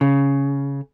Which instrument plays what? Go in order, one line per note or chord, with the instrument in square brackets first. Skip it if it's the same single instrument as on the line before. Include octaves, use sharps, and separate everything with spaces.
[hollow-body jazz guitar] C#3